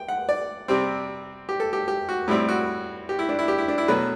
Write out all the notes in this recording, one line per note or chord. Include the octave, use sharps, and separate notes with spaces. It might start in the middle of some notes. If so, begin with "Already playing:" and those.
Already playing: G5
F#5
D5
C3 G3 C4
G4
A4
G4
G4
F#4
A2 G3 C4 E4
F#4
G4
E4
D4
E4
G4
E4
D4
E4
B2 F#3 A3 B4